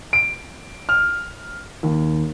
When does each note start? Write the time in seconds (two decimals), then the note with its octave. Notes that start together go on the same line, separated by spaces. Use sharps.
0.13 D7
0.89 F6
1.83 D#2